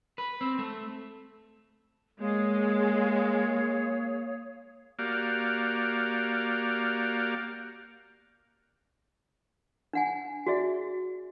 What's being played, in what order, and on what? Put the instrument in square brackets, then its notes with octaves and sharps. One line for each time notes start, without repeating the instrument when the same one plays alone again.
[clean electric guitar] B4
C4
A3
[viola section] G#3 [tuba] A#3 [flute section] C#5 F5 D#6
[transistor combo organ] A#3 F#4 G4 D5 F5
[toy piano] D4 F#5 G#5
F#4 G#4 D5 E5